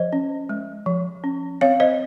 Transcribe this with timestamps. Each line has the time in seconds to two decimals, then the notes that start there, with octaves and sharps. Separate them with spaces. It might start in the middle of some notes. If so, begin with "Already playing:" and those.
Already playing: F3 C5 D#5
0.13 C#4
0.49 G#3
0.86 F3
1.24 C#4
1.61 C4 C#5 F5
1.80 C5 D#5